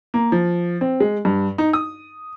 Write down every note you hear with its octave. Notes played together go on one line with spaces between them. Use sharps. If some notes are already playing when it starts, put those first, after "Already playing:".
A#3
F3
C4
G#3
G2
D#4
D#6